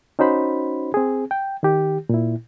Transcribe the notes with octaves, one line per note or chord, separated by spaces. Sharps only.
C#4 D#4 F#4 C5 B5
C4 G#4
G5
D#3 G4
A#2 E4